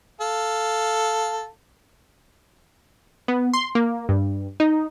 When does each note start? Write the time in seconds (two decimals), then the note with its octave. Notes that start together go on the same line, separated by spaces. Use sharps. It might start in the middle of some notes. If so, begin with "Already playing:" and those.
0.21 A4 F5
3.28 B3
3.53 C6
3.75 A#3
4.09 G2
4.60 D#4